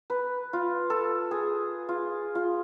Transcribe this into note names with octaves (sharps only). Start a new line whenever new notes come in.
B4
F4
A4
G#4
F4
F4